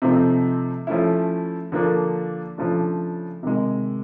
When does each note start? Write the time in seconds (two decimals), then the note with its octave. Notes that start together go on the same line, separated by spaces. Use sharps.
0.02 C3 F3 A3 C4 D#4
0.87 F3 A3 C#4 E4
1.72 D3 F3 A#3 D4
2.58 C#3 F3 A3 D4
3.43 C3 D#3 G#3